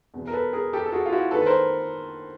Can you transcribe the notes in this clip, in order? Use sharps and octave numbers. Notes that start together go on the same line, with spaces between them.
E2 B2
A#4
A4 B4
G#4 A#4
G4 A4
A4
F#4 G#4
F4
E4 F#4
D#2 D#3 A4 B4
B4
A#4 C5